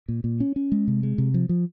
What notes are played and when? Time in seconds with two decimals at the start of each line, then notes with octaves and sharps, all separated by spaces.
0.08 A#2
0.24 A#2
0.40 C#4
0.56 C#4
0.72 G#3
0.88 C3
1.03 G#3
1.18 C3
1.34 F3
1.49 F3